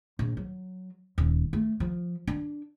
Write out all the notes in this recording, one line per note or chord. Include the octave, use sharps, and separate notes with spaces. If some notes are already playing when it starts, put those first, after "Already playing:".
A#1
F#3
D#1
A3
F3
D4